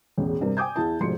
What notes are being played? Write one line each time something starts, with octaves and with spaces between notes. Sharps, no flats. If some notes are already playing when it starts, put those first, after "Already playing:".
E1 A1 E2
G2 C3 A#4
G5 G#5 D6 D#6 G6 G#6
E2 E4 A5
F1 G#2 B2 F3 C6 C#7